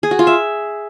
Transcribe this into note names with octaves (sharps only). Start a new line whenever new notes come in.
G#4
F#4
F4
E5